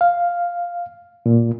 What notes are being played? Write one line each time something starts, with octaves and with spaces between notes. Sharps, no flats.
F5
A#2